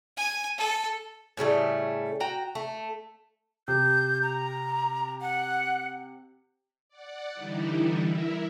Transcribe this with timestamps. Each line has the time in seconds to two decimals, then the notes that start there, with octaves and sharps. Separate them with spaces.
0.17 G#5
0.58 A4
1.37 A2 C#3 G3 A3
2.20 F#4 G5 A#5
2.55 A3
3.68 C3 G6
4.23 A#5
5.21 F#5
6.89 D5 F#5
7.33 D3 E3 G3 D#4 E4
8.03 E4 A#4 E5